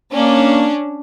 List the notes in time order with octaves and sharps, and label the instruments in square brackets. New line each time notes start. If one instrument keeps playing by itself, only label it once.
[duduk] A#3 [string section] C#4 D4